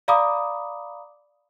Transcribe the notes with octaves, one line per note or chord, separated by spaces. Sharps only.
D5 F5 A#5 B5 D6 D#6